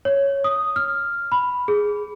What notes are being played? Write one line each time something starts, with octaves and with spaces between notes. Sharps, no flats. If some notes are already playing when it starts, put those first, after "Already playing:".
C#5
D#6
F6
B5
G#4